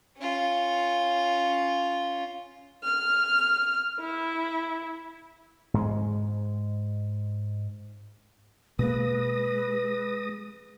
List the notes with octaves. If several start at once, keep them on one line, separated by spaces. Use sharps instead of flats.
C#4 F4
F6
E4
G#2 G#3
B2 G#3 A#3 B4 D#6 A#6